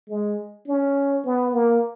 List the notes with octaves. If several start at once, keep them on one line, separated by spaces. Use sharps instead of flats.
G#3
C#4
B3
A#3